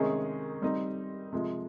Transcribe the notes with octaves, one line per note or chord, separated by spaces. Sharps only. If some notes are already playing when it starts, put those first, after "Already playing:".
Already playing: C3 D#3 G#3 C#4 G#4
G3 C4 D#4
C3 F3 G#3